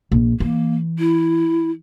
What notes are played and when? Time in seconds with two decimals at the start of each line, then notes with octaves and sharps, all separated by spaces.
0.12 A#1
0.40 E3 A#3
0.99 E4